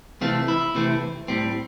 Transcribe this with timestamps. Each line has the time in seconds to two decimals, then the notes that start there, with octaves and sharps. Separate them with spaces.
0.21 C3 E3 A3 C4 F4
0.48 E4
0.75 C3 E3 A3 C4
1.28 A2 G3 C4